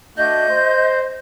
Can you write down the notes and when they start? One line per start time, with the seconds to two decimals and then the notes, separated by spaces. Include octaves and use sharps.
0.17 A3 D4 F#4 D#5 G6
0.50 C5